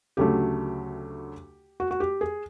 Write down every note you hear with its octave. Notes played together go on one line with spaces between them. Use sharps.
D2 C#3 F#3 A3 G4
F#4
F#4
G4
G#4